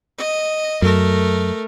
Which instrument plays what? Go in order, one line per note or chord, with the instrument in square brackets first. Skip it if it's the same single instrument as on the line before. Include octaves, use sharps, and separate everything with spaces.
[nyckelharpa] D#5
[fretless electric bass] F#2 [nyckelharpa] A3 A#4